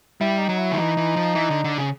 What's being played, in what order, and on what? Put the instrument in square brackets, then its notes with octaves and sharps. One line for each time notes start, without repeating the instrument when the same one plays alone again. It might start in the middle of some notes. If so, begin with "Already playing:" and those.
[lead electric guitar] G3 [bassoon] E4
[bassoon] D#4
[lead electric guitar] F#3
[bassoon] E4
[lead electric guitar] D#3
[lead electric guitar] E3 [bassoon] D#4
[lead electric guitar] E3
F3
E3
D3
D3
C#3